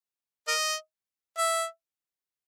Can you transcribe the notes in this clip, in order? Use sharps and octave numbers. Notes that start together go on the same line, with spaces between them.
A#4 D#5
E5